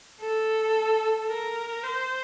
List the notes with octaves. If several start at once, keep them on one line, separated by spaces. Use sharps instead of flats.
A4
A#4
C5